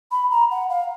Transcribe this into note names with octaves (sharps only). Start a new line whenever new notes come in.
B5
A#5
F#5
F5